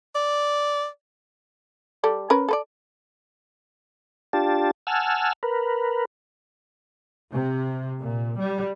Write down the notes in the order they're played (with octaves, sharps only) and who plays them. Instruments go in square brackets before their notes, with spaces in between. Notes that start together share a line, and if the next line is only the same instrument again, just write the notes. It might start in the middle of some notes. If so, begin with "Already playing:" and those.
[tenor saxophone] D5
[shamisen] G3 A4 D5
C#4 A#4 B4
A4 B4 D5
[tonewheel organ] D4 F4 G4 A5
F#5 G#5 A5 E6 F6
A#4 B4
[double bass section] C3
A#2
G3